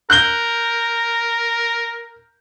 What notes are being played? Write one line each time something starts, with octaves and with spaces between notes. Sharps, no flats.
A#4 F#6 G6 G7